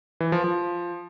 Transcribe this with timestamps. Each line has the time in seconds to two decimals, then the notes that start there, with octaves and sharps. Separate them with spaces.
0.20 E3
0.32 F3
0.44 F3